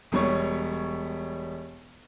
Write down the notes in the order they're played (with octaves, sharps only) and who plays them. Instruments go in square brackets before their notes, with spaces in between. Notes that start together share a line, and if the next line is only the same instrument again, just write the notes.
[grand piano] E1 G3 C#5